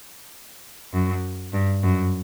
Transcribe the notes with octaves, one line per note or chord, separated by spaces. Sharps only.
F#2
G2
F#2